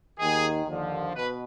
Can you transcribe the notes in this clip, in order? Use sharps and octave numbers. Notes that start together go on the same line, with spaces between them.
D#2 D#3 G#4
D#2 D3 F3
B2 B4